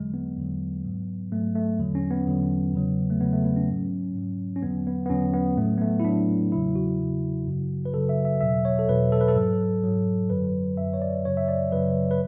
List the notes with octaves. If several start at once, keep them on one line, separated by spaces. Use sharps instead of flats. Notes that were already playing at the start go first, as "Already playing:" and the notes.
Already playing: E2 D3 F#3 G#3
B3
E2 D3 F#3
G#2 F#3
G#2 F#3 A3
A3
E2 D3 F#3
C#4
B3
E2 D3 F#3
E2 C#3 F#3
A3
E2 C#3 F#3 B3
A3
B3
C#4
G#2 F#3
G#2 F#3
C#4
E2 D3 F#3 B3
B3
B3
E2 D3 F#3 C#4
B3
A2 A3
F#3
B3
A3
E4
A2 F#3 D4
E2 C#3 F#3 E4
F#4
E2 C#3 F#3
F#2 C#3 F#3
B4
F#2 C#3 F#3 A4
E5
E5
E2 B2 F#3 E5
C#5
A4
E2 B2 F#3 B4
A4
B4
A4
G#2 F#3
G#2 F#3
F#2 D3 F#3 B4
F#2 D3 F#3 E5
C#5
D5
F#2 C#3 F#3 C#5
E5
D5
F#2 C#3 F#3 B4
B4